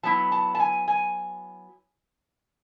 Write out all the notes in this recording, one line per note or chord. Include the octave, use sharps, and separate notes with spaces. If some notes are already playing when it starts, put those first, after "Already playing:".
F#3 B3 E4 A5
A5
A5
G#5
G#5